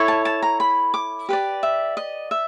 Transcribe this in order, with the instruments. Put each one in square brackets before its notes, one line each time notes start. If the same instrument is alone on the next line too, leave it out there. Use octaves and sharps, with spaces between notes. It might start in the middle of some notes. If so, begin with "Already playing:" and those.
Already playing: [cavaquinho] E4 A4 C#5
A5
A5
A#5
B5
D6
G4 B4 D5
E5
D#5
E5